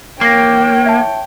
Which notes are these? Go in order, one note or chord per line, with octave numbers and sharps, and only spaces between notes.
A#3 C#5 G5 A#6 C7
E5 A5